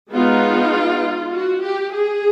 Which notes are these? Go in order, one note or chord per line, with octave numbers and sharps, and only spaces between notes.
G#3 B3 D#4 F4
F#4
G4
G#4